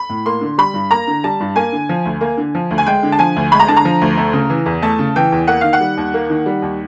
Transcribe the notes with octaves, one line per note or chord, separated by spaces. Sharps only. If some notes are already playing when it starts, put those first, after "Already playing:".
Already playing: B5
A2
A#3 C6
D3
G3 B5
G2
A#3 A#5
D3
G3 A5
G2
A#3 G#5
D3
F3
D2
A#3
D3
F3
D2
G#5
G#3 G5
D3
A5
F3 G#5
D2
G#3 B5
A#5
D3 A5
A#5
F3
D2
A3
C#3
E3
E2
A3 A5
C#3
E3 G5
E2
A#3 F#5
D#3 F5
F#5
G3
D#2
A#3
D#3
G3
D#2